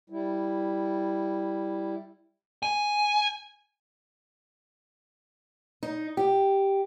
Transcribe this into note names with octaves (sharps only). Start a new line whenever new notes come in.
G3 E4
G#5
D#4
G4